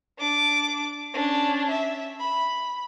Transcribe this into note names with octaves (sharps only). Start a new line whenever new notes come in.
D4 D6
C#4 D4
E5
B5